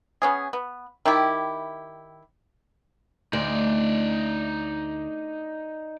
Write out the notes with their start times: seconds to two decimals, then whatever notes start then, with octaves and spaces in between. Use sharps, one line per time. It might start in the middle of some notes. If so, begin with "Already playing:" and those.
0.22 B3 C#4 G#4
0.53 B3
1.05 D#3 E4 G4
3.33 D2 D#4 D5